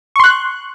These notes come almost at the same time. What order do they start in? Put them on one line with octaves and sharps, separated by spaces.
C#6 C6 F#6